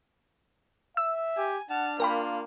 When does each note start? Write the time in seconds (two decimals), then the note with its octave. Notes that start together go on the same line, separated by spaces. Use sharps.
0.97 E5 E6
1.37 G4 G#5
1.70 D4 F#5 A5 F6
2.00 A#3 F4 A#4 G5 B5